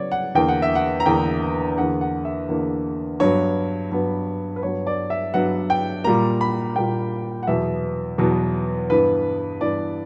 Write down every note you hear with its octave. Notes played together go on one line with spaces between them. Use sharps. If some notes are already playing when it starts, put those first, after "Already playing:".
Already playing: C#3 F#3 B3 C#5 D5
F#5
E2 D3 A#3 G5
F#5
E5
F#5
A#5
E2 D3 A#3 G5
E2 D3 A#3 F#5
F#5
E5
E2 D3 A#3
G2 F#3 B3 C#5
G2 F#3 B3
B4
G2 F#3 B3 C#5
D5
E5
G2 F#3 B3 F#5
G5
A#2 G3 A#3 A#5
B5
A#2 G3 A#3 G5
F#5
E2 B2 F#3 B3 E5
E2 B2 F#3 B3
G2 E3 B3 B4
G2 E3 B3 D5